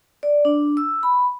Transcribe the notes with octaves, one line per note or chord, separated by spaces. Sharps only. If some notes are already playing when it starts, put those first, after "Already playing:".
D5
D4
E6
B5